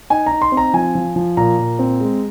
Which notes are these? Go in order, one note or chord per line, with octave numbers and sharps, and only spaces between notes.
D#4 G#5
D#4 A#5
C6
C4
A#5
F3 G#5
F3
F3
A#2 A#5
A#2
C4
G#3